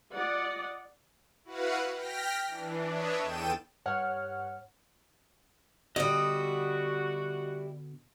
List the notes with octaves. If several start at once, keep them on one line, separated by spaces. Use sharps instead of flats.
F4 D5 D#5 F#5
E4 F#4 B4 F5 F#5
G5 F6 A#6 B6
E3 D4
D4 B4 C#5 D#5 E5
E2 A4 G5 D#7 E7
G2 C#5 F#5 F6
B2 D3 G3 E4 F#4 D#5 D#6